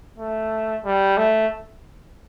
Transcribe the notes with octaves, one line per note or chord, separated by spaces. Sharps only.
A3
G3
A3